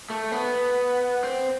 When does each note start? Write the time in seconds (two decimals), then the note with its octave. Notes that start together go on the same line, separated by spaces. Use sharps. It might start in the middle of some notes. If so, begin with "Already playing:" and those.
0.10 A3
0.32 B3
1.24 C4